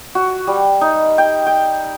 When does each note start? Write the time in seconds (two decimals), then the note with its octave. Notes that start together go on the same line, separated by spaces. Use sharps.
0.15 F#4
0.47 G3
0.81 D#4
1.18 G5
1.46 G5